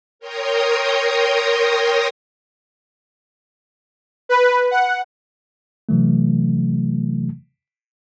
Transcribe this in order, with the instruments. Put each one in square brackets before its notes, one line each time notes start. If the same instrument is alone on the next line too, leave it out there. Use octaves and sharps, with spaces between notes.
[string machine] A#4 C#5 G5 A#5 C6 D#6
[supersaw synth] B4
F#5
[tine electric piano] C3 E3 F#3 A3